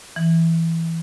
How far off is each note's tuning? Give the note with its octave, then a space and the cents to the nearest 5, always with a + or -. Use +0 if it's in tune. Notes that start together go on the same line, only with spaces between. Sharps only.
E3 +0